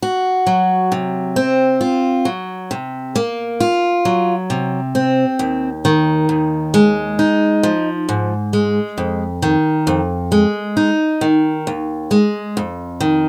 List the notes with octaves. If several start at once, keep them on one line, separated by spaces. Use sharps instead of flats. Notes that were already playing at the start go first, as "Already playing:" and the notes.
F#4
F#3
C3
C4
F4
F#3
C3
A#3
F4
F#3
C3
C4
D#2
D#3
D#2
G#3
D#4
F3
G#2
G#3
F2
D#3
F2
G#3
D#4
D#3
D#2
G#3
F2
D#3